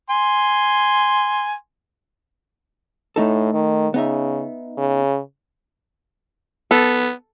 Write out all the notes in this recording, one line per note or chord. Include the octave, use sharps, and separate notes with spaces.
G#5 C6
A2 A3 D#4 A4
D#3
C#3 B3 D#4 E5
C#3
B3 A4